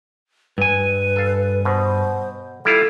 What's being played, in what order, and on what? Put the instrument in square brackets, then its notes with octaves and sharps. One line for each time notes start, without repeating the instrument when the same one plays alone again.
[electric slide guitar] G2 G#5 [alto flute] B4
[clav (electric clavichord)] A4 F5
[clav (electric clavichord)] B2 [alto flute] C5
[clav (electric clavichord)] G3 E4 F4 [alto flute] A4